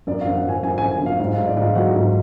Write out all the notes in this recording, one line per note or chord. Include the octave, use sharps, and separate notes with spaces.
F#2 D5
F5
F#2
F#5
F#2 G#5
F#2 G#5
F#2 G#5
G#5
F#2
F5
G#2 F5
G#2 F5
D5
G#2
F5
F#3 F#5
G#2